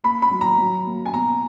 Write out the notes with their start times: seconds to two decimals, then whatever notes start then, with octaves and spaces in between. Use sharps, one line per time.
0.04 A#3 B5
0.22 B5
0.31 F#3
0.41 A#5
0.58 F#3
0.86 A#3
1.06 G#5
1.14 B2 A#5